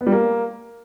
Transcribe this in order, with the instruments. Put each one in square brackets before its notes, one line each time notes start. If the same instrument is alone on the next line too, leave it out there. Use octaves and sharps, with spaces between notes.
[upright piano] B3
G3
A#3